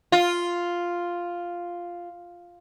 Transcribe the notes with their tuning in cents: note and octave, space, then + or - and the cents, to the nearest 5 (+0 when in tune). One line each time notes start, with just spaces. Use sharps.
F4 +0